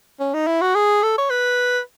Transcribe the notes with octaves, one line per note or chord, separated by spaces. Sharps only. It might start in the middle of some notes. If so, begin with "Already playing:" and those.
C#4
D#4
E4
F#4
G#4
A4
C#5
B4